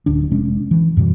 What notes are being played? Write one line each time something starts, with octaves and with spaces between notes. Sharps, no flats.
D1 D2 D4
F1 C3 G#3 C#4
E3
F#2 B2 E3 G3